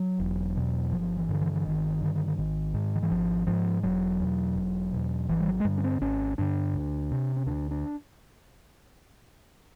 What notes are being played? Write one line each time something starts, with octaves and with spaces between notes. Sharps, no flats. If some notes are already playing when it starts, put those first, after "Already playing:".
Already playing: F#3
E1
E2 B2
G1 F3
E3
G2 D3
E3
E3
G1 D#3
G2 D3
G#1
G#2
D#3
E3
G#1 F3
G#2 F3
E1 F#3
E2 B2
E1
E2 B2
G#1 E3
G3
F#3
G#3
G2 D3 G3
C#4
C4
G#1 C#4
G2 D3 D4
D2
C3
C#4
D2 D4
D4